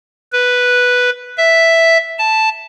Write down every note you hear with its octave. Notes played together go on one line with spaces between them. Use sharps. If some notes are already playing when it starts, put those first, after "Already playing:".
B4
E5
A5